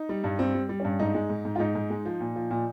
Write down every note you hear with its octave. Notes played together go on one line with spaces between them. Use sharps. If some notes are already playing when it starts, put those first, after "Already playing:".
Already playing: D#4
G3
G2
G3 C4
G3
G3
G2 C#4
G#2 D#4
G#3
G#2
G#2
F4
G#2 D#4
G#2
G#3
F3
A#2
F3
A#2